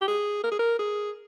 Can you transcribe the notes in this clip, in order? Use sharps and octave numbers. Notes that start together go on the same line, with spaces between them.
G4
G#4
A#4
G#4
A#4
G#4